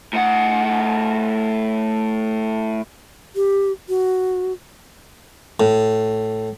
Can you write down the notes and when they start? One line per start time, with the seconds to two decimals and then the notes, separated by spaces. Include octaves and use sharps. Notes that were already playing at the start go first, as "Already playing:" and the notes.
0.13 A2 F#5
3.35 G4
3.89 F#4
5.60 A2